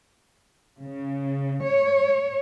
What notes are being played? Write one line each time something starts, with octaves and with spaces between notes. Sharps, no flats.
C#3
C#5